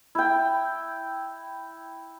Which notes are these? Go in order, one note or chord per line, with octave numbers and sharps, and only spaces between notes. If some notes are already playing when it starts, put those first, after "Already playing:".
E4 G5